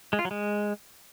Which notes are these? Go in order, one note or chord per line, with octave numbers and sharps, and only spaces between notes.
G#3
F4
F#3
G#3